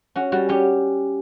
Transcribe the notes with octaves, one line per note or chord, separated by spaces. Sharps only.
C#4 F#4
G3 F#4
C#4 G4